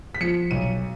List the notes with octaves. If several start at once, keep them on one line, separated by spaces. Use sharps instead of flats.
B6
F3 C#7
B1 D#7